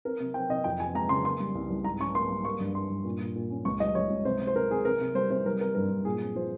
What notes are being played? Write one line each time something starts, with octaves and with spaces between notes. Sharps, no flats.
C4 A#4
C3
C4 G5
C3 D#5
F2 G5
F2 G#5
G#3 A#5
C#3 C6
A#3 C6
G3
C2
C2
G#2 A#5
C#4 C#6
A#3 C6
G3
A#3 C#6
G2
A#3 C6
G2
A#2
A#2
A#2
C#4
C#2 C#6
G3 D#5
C#2 C#5
C#2
C3 C5
C3
C5
C4 A#4
C3 G#4
C3 A#4
C3
G3 C5
C3 C5
G3 A#4
C4 A#4
G2 A#4
G2
A#2 G#4
C4
F3 C5